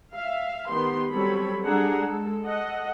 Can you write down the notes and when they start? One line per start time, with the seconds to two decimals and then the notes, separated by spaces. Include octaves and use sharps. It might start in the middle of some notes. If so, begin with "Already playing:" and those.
0.14 E5 F5
0.69 D#3 B3 G4 C6
1.11 F#3 G3 C4 A4 C#5 B5
1.64 G3 D4 G#4 A4 F#5 A#5
2.02 G#3 A4
2.46 A4 D#5 F#5